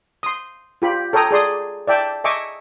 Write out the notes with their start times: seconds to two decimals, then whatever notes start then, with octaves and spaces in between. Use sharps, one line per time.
0.23 C6 D#6
0.82 F4 G4 B5
1.13 A4 C#5 G5 A#5 D#6
1.31 G#4 D5 C6 D#6
1.87 D5 E5 G5 A5
2.24 D#5 E5 G#5 C#6 D6